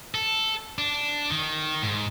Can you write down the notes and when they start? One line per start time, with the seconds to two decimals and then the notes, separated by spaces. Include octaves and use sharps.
0.15 A4
0.78 D4
1.30 D#3
1.83 G#2